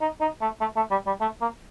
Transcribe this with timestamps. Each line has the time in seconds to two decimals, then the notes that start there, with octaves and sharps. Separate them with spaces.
0.01 D#4
0.21 D#4
0.42 A3
0.61 A3
0.76 A3
0.91 G3
1.07 G3
1.21 A3
1.41 A#3